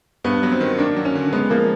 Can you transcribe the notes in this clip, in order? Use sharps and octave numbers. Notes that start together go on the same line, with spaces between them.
G2 B3
F#3
C4
D#3
A#3 D4
F#3
C#4
D3
G#3 B3
F3 A#3